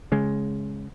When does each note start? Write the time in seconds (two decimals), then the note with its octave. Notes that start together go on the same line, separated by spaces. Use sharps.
0.12 C#3 G#3